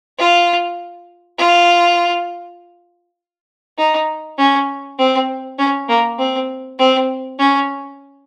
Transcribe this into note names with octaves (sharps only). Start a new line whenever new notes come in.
F4
F4
D#4
C#4
C4
C#4
A#3
C4
C4
C#4